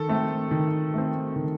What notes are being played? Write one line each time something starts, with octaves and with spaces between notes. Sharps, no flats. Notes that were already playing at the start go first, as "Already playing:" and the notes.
Already playing: D#3 A4
A3 C4
D#3
A3 C4
D#3